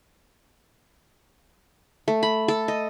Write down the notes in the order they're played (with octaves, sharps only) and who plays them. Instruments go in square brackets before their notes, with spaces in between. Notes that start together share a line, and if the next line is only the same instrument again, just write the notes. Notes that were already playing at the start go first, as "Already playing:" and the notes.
[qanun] A3
B5
A4
D#5